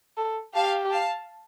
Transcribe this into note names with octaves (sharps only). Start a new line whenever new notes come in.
A4
G4 F5 A5
F5 A5